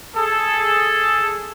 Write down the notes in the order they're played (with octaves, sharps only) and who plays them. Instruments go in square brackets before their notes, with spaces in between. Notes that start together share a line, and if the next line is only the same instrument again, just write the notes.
[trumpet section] G#4 A4